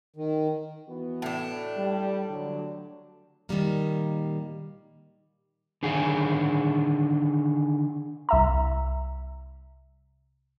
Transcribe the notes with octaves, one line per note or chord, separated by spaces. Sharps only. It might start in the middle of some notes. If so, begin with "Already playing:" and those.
D#3
E3 B3 F#4
A2 D4
G3
D3 F#3
A#2 D#3 F3 G3 A#3
D3 D#3 G#4
C2 E5 A#5